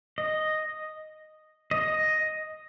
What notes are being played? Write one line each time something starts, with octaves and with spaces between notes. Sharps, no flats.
D#5
D#5